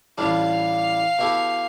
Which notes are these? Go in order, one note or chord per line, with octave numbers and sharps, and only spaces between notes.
A1 A2 G3 D4 F4 F5
B2 A3 E4 G4